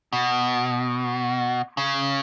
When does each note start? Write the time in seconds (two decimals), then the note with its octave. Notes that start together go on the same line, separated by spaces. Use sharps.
0.13 B2
1.77 C#3